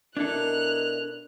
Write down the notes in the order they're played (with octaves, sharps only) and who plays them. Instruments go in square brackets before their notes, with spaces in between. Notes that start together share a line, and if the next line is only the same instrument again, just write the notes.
[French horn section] B2 A#4 [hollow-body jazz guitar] D4 E4 A4 [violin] F#6 F7